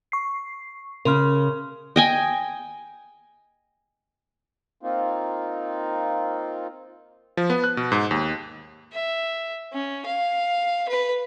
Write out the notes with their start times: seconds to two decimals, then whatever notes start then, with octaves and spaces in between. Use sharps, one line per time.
0.12 C#6 C7
1.05 C#3 A#4 C6 F6
1.96 D#5 G5 G#5
4.82 A#3 C4 D#4 F4
7.37 F3
7.50 B3
7.64 F#6
7.77 B2
7.92 G#2
8.11 D#2
8.92 E5
9.73 C#4
10.06 F5
10.89 B4